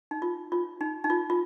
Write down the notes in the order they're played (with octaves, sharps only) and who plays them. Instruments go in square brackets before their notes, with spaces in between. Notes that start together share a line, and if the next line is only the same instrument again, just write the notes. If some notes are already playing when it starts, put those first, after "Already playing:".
[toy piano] D#4
F4
F4
D#4
D#4
F4
F4